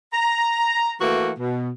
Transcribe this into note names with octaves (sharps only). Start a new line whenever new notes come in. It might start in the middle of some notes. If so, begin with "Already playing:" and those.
A#5
E3 A3 A#3 F#4
B2